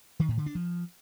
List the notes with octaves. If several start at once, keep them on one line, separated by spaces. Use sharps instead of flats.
D#3
A2
D3
D4
F3